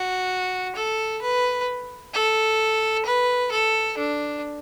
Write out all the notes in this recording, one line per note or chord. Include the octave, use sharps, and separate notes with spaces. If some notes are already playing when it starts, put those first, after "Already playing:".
Already playing: F#4
A4
B4
A4
B4
A4
D4